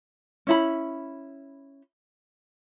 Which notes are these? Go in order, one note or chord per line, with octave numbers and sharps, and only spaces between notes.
C#4 E4 B5